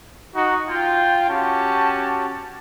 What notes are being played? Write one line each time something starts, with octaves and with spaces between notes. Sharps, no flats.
D#4 F#4
F4 G5
C#4 F#4 G4 A5